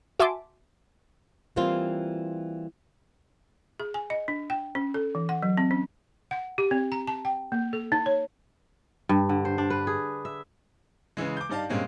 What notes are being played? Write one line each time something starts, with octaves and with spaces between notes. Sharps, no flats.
F#4 E5 G#5 A5 C6 D6
E3 G3 A#3 C4 F4
G#4
G#5
D#5
D4
G5
C#4
A4
E3
F#5
F#3
C4
C#4
F#5
G4
C4
A#5
A5
G5
A#3
A4
D#4
C#5
G2
D3
C5
D4
B4
G#4
E5
C#3 E3 G#3
D6 G6
G2 D#4 D5 F5 A5
G2 A#2 G#3 A#3 C4 C#4